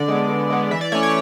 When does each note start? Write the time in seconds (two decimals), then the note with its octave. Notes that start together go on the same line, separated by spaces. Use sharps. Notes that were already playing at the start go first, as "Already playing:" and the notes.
Already playing: D3 D5
0.08 G#3 B3
0.29 D3
0.50 G#3 B3
0.71 E3 E5
0.81 D5
0.92 A3 C#4 C#5
1.03 C#5